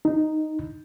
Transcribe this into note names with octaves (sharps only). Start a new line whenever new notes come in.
D#4